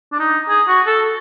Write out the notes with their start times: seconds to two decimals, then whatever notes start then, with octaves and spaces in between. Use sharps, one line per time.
0.12 D4
0.19 D#4
0.49 G#4
0.68 F#4
0.87 A4